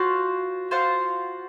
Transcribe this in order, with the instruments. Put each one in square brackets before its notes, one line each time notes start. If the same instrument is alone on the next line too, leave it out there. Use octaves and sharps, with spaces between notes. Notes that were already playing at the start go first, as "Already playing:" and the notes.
Already playing: [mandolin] F4 C5 [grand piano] F#4
[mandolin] F4 C5 F#5